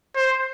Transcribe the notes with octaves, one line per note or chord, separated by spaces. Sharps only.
C5